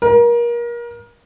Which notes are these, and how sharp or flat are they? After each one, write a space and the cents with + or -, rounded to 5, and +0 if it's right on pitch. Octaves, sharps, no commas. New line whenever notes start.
A#4 +30